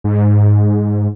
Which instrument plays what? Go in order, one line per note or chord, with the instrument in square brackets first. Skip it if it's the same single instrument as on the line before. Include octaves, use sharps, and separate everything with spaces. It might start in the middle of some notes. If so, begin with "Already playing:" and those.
[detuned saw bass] G#2